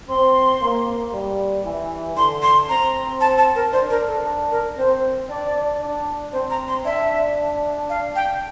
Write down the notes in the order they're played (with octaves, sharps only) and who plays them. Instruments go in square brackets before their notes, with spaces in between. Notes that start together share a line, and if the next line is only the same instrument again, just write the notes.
[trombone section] C4 [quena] C6
[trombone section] A#3
G3
E3
[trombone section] D3 [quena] C6
[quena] C6
[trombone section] C4 [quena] A#5
[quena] A5
A5
A#4
[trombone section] D4 [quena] C5
[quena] A#4
A4
A#4
[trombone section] C4 [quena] C5
[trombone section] D4 [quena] D5
[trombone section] D4
[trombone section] C4 [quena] C5
[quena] A#5
C6
[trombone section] D4 [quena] E5
[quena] F5
G5